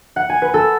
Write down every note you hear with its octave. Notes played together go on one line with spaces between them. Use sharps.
F#5
G#5
B4
A4